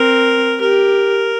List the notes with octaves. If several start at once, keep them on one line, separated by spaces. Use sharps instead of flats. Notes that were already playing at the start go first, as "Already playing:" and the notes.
Already playing: C4 A#4
G4 A#4